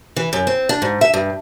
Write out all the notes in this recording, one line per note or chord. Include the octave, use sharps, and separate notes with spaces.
E3
F#2
C4
D4
G#2
E5
G2